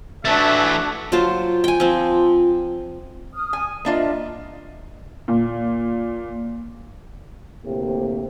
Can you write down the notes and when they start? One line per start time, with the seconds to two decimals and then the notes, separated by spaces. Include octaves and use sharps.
0.25 E3 A3 D4 F#4 E5 A5
1.12 F#3 F4 C5 A5
1.64 G5 G#5
1.80 F3 C4
3.34 D#6 F6
3.53 G#5
3.85 A#3 D4 F4 D#5 E5 A5
5.28 A#2
7.65 D2 A2 C3 A#3 G4